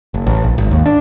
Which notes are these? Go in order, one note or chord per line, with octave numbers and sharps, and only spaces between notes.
F#1
A1
A#1
G#1
D#2
D4